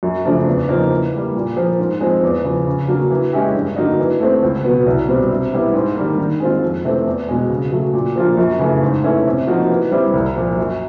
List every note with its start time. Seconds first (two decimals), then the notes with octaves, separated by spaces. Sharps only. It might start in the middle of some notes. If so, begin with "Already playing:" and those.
0.03 F#2
0.25 C#3 F3 A3 D4
0.47 E2
0.69 C#3 F3 A#3 D#4
0.90 E3
1.13 G3 A#3
1.35 A#2
1.57 F3 A#3
1.79 G#2
2.01 F3 G#3 C4
2.23 E2
2.44 C#3 F3
2.67 C#3
2.88 F#3 A#3 D4
3.11 E3
3.33 G#3 C#4 E4 G4
3.54 G2
3.76 D3 F#3 A#3 D#4
3.99 E3
4.20 A3 C4
4.43 C#2
4.64 B2 F#3 B3
4.86 C2
5.08 B2 G3 C4
5.30 C3
5.53 E3 G3 B3 E4
5.74 G#2
5.96 D#3 G3 A#3
6.18 D#3
6.40 G#3 C4 F4
6.63 F2
6.84 C3 E3 A3 C4
7.06 E2
7.29 B2 G#3
7.50 C#3
7.71 F#3 A3
7.93 A#2
8.16 F3 A#3 D4 F4
8.37 F#2
8.59 C#3 E3 A3
8.82 G#2
9.04 E3 A3 C#4 E4
9.26 C3
9.47 F3 A#3 D#4 F#4
9.70 E3
9.91 G3 C4 E4
10.14 C2
10.36 A#2 F3 A#3
10.57 F#2